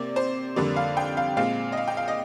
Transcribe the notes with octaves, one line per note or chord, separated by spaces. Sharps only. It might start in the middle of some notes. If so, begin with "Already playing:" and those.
Already playing: C3 A#3 D5
C5
F2 D3 G3 A#3 D5
F5
G5
F5
A#2 G#3 C4 F5
D#5
F5
G5
F5
D#5